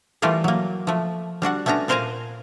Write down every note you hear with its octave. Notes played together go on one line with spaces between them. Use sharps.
E3 G3 A3 F4 A4 A#4
F#3 A#3
F3 A3
G3 D4 F#4 F#5
A3 B3 C#4 D4 A#5
A#2 A#4 C5 F5 G#5 A#5